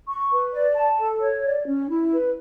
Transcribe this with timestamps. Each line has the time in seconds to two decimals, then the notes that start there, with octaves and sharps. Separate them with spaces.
0.07 C#6
0.31 B4
0.53 D5
0.76 A5
0.98 A4
1.21 C#5
1.44 D5
1.66 C#4
1.89 E4
2.11 B4